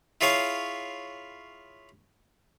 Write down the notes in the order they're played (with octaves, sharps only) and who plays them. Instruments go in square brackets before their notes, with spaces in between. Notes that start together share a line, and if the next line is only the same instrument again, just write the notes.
[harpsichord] E4 F4 G#4 C#5 F5